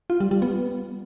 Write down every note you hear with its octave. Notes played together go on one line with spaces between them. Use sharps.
F4
G3
G3
B3